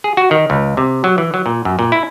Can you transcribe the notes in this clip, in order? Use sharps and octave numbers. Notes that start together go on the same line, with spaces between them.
G#4
F#4
D#3
C#2
C3
F#3
E3
F#3
A#2
F#2
A#2
E4